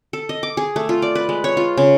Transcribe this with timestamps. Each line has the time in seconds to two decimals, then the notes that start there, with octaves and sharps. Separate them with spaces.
0.13 A4
0.29 D#5
0.43 D6
0.57 G#4
0.76 A3
0.89 F4
1.02 D5
1.15 B4
1.29 G#3
1.44 C#5
1.57 F4
1.78 C#3